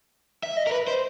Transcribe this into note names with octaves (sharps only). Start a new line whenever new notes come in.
E5
D#5
A#4
B4
C5